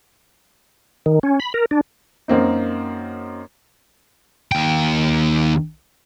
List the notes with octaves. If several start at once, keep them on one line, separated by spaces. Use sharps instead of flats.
D#3
C#4
B5
A#4
D4
F#2 A#3 C4 D#4
D#2 G5